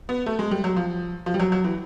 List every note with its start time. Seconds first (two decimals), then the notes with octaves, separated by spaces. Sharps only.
0.09 B3
0.26 A3
0.39 G#3
0.51 G3
0.64 F#3
0.76 F3
1.26 F3
1.34 G3
1.40 F#3
1.52 F#3
1.64 E3